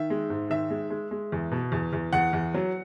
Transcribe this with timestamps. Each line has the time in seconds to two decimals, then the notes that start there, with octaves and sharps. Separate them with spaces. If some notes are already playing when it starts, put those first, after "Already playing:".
Already playing: D#3 E5
0.10 G#3
0.30 G#2
0.50 D#3 E5
0.70 G#3
0.90 G#3
1.11 G#3
1.32 E2
1.51 B2
1.72 E2
1.93 E2
2.13 E2 F#5
2.33 E2
2.54 F#3